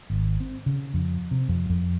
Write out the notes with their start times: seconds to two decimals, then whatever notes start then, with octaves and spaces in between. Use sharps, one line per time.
0.10 G#1
0.40 C4
0.66 C#3
0.94 F2
1.31 C3
1.49 F2
1.69 F2